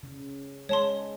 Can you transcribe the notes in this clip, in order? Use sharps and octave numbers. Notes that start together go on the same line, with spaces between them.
C#3
G#3 C#5 A5 C6